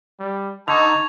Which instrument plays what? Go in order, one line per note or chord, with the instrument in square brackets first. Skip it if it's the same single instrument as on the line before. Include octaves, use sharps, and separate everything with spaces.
[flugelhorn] G3
[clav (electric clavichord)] D3 [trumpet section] D#4 [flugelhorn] A5 [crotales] C#6 G#6 F7